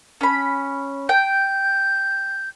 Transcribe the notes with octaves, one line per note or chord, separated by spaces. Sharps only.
C#4 B5
G5 G6